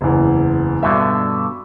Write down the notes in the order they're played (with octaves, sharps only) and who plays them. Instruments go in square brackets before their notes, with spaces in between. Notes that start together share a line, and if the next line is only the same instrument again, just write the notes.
[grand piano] F#1 E2
[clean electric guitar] G2 B2 D3 [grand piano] E5